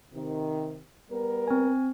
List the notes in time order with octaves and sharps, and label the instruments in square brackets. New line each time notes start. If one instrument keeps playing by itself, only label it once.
[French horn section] C3 D#3
G3 B3 A#4
[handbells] C4 G#5